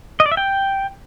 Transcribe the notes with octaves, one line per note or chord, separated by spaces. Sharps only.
D#5
D5
E5
G5